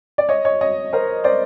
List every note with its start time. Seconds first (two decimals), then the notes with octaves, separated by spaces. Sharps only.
0.18 D5
0.29 C#5 D#5
0.45 C#5 D#5
0.61 C#5 D#5
0.93 A#4 C5
1.24 C5 D5